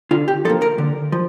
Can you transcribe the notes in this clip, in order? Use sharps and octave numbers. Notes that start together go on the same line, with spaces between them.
D3 F4
G4
F3 A#3 A4
A#4
D3
F3